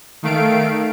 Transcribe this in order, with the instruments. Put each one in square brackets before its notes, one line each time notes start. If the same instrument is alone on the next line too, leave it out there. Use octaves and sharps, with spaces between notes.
[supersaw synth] D#3 A3 F5 D7